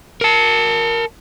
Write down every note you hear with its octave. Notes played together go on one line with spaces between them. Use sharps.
A#4 A5